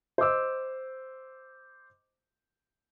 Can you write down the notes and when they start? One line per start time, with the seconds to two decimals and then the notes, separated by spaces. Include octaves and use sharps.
0.18 C5 D#5 D6 E6